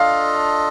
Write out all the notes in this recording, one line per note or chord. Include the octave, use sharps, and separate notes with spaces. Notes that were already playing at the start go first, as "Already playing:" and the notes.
Already playing: D4 F4 A4 D#5 F5